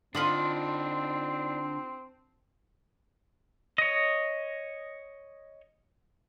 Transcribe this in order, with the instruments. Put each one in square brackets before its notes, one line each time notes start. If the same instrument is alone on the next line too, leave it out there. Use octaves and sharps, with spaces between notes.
[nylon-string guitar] D3 [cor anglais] C4 [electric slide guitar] D4 D#4 [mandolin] F4 B5 D#6
[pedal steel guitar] C#5 D#5